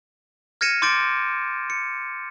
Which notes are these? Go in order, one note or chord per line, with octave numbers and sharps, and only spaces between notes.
F6 G#6 A#6 C#7 D#7 E7
C6 D6 G6 A6 D7
C#7